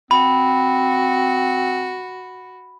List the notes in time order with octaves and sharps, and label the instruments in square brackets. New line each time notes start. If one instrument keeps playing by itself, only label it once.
[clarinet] C4 [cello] F#4 [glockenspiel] B5